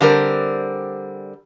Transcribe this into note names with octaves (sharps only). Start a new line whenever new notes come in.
D3 G3 C4 A#4